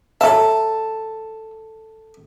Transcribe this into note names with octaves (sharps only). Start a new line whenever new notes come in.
F#3 A4 E5 A5